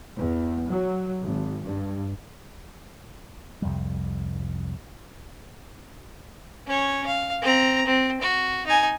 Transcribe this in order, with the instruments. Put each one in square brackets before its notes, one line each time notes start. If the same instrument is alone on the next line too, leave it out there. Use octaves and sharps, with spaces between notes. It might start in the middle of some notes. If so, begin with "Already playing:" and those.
[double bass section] E2
F#3
G#1
G2
[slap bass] C2 F2 G3
[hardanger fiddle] C#4 C#5
F5
C4 A#5
C4
F#4
D#4 G#5